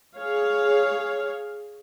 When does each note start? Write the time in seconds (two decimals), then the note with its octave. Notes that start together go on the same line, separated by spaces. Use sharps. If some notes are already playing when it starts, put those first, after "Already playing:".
0.17 G#4 C#5 F5